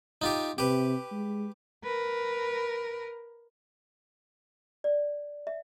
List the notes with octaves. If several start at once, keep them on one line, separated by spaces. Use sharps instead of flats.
D#4 F4 G4
C3 G4 B4
G#3
A#4 B4
D5
E5